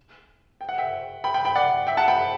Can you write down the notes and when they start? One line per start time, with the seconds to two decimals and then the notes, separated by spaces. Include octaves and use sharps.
0.61 G5
0.69 F#5
0.78 E5 G5
1.24 G5 B5
1.34 G5 B5
1.45 G5 B5
1.55 D5 F#5
1.87 E5 G5
1.97 F#5 A5
2.08 G5 B5